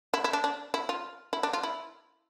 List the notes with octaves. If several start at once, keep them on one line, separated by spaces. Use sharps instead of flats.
E4
E4
D4
D4
E4
F4
E4
D4
F4
E4